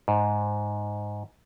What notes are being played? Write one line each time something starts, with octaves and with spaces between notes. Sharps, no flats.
G#2